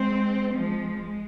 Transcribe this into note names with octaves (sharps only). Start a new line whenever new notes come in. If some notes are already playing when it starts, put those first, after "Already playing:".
Already playing: G#3 C4
F3 G#3
G#3